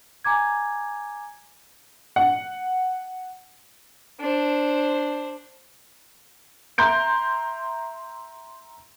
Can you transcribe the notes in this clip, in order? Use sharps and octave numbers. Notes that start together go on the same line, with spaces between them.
G#5 A#5 D6 G#6
F#5
D4 C5
E5 A#5 C6 G6 D7